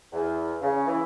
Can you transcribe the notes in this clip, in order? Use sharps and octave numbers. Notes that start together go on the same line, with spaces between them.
E2
C#3
E3